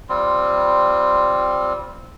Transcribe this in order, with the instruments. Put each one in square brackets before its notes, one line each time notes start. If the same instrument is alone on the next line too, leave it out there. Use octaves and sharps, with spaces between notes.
[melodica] G3 C4 F4